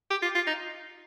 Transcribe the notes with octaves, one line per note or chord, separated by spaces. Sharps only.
G4
F4
F4
D#4